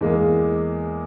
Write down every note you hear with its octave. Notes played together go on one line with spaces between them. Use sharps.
E2 G#3 A#3